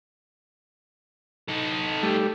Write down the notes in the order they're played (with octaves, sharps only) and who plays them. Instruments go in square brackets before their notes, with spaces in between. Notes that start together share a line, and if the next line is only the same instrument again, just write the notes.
[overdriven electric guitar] D#4 A4
[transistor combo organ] G3 A3